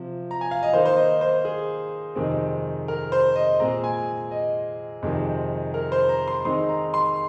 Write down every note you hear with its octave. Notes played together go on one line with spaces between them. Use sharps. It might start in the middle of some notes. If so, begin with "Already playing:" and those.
Already playing: C3 F3
A#5
G#5
F5
D#5
D#3 A#3 D#4 C5
C5
D#5
C5
G#4
F2 C3 D#3 G#3 C4
A#4
C5
D#5
A#2 G#3 C4 A#5
G#5
D#5
F2 C3 D#3 G#3
A#4
C5
A#5
C6
D#3 G#3 C4 D#4 C6
A#5
C6